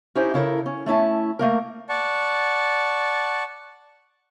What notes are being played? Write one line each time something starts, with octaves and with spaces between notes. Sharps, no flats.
C#4 D#4 E4 G4 C5
C#3 E4 A4 A#4
C#4
A3 C#4 E4 A5
A3 A#3 A#4
D5 F#5 A5 C#6